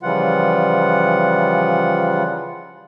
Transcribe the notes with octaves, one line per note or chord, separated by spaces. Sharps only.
C#3 E3 F3 G3 F4 F#5